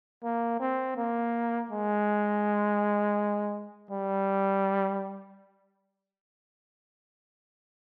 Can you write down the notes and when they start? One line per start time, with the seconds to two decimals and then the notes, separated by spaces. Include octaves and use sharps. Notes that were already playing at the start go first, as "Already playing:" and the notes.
0.24 A#3
0.60 C4
0.97 A#3
1.71 G#3
3.91 G3